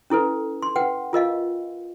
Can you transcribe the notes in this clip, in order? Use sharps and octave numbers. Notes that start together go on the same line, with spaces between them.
C#4 E4 A4 B4
C6
B4 F#5 G5
F4 A#4 D#5 F5